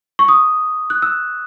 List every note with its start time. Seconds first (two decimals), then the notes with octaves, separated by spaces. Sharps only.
0.19 C#6
0.28 D#6
0.90 F#6
1.02 E6